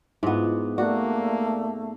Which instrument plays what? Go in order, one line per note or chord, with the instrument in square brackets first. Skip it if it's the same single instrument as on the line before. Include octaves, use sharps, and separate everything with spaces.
[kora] G#2 B3 [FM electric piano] E4 F4
[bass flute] A3 [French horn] A#3 [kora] F#4 [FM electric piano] D5